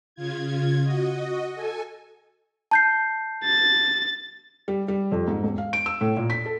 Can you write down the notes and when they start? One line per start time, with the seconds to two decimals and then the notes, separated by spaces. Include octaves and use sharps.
0.15 C#3 F4 G#6
0.84 F#4 D#5
1.55 A4 G#5
2.71 A5 G6 C7
3.44 A6
4.68 G3
4.88 G3
5.12 F2
5.28 G#2
5.43 E1
5.58 F5
5.73 D7
5.86 E6
6.01 A2
6.17 A#2
6.30 B6
6.46 A4